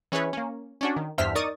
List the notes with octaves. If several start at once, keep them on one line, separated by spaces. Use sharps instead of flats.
E3 C#4 G#4 B4 C#5
A#3 C#4
C#4 D4 F#4
D#3
E2 G2 C5 E5 F6 B6
D#4 A#4 D5 C#6 D#6 A6